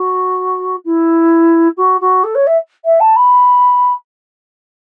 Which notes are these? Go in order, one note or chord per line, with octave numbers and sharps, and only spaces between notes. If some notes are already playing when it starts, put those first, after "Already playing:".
Already playing: F#4
E4
F#4
F#4
A4
C#5
E5
E5
A5
B5